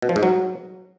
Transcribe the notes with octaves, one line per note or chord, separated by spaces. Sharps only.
B2
F3
G#2
F#3